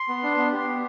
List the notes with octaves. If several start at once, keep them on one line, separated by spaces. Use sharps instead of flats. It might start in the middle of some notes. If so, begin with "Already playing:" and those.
Already playing: C6
B3
D4
B3
G4
B3